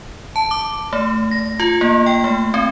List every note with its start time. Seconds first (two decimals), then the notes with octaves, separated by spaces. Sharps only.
0.36 A5
0.51 D6
0.93 A3
1.31 A#6
1.60 F4
1.81 A#3
2.06 G5
2.24 A3
2.54 C4